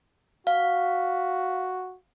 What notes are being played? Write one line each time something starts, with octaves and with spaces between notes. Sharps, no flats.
F#4 F5